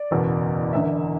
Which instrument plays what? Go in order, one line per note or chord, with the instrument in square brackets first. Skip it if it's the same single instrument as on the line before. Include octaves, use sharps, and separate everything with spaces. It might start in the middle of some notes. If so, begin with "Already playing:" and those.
Already playing: [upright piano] D5
F#1 E2 B2
E1 E2 D3 E5